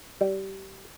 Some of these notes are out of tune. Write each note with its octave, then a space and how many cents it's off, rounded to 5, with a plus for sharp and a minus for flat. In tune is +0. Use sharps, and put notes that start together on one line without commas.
G3 -20